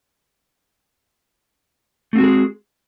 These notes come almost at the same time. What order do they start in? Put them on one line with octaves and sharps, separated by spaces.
A3 C4 F#4 G#3 G#4